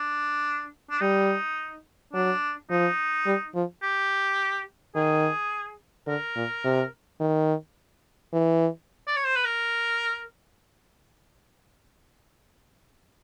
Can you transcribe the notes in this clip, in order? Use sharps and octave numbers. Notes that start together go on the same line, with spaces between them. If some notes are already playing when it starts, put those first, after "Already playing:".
Already playing: D4
D4
G3 D#4
F#3 D4
F3 D#4
G3
F3
G4
D#3 G#4
D3 A#4
A#2
C3
D#3
E3
D5
C#5
C5
B4
A#4